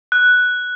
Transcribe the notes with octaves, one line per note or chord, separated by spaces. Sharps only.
F#6